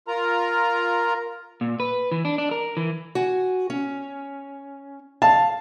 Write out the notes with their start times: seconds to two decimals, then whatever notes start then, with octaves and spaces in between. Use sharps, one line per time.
0.08 F4 A#4 A#5
1.61 A#2
1.80 B4
2.12 E3
2.25 D4
2.38 D4
2.51 A#4
2.77 E3
3.15 F#4 G#5
3.70 C#4
5.22 F5 A5